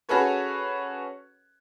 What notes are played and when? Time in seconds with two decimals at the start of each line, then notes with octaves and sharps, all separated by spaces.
0.09 C#4 F#4 G#4 A4 B4 C#5